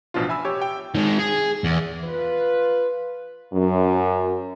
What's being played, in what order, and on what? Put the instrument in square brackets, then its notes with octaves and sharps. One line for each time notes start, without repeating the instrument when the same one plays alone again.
[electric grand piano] A1 B2 F3 D4 F4
E5 G#5 B5 E6
G4 C#5
G5
[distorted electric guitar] D#3 G#3
G#4
E2
[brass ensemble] F4 B4
[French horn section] F#2